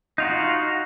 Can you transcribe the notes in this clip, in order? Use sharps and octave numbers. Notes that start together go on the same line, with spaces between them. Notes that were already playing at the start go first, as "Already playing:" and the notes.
D#4 F4 F#4